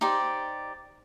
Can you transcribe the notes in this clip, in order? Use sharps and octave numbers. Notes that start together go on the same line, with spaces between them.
D#4 G4 C5 D5